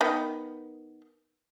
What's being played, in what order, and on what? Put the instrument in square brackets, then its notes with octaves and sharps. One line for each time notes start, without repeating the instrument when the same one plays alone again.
[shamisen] D#3 B3